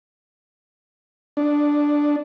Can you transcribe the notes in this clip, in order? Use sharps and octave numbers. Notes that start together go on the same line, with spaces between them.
D4